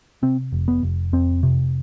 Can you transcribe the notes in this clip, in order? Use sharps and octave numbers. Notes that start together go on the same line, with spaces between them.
C3 C4
F1
B3
F1
F2 C4
C3